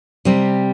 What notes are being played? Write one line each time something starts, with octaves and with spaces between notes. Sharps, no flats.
C3 G3 C4